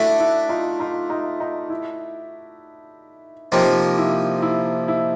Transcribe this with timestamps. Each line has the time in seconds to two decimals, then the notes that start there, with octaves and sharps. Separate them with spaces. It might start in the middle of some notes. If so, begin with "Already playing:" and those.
Already playing: A3 D4 E4 F#4
0.20 E4
0.49 D#4 F4
0.80 D#4 F4
1.10 D#4 F4
1.40 D#4
1.70 E4
3.52 C3 F3 A#3 D#4 F4
3.98 E4
4.42 E4
4.88 E4